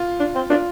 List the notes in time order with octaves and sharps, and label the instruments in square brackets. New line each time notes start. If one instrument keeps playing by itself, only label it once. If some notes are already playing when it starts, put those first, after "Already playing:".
Already playing: [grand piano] F4
[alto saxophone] D4
C4
[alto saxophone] D4 [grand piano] F4